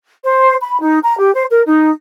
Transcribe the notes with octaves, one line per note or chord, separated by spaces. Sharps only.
C5
B5
D#4
A#5
G4
C5
A#4
D#4